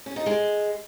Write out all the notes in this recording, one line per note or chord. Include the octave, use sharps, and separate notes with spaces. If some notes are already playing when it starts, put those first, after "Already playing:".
C#4
D#4
G#3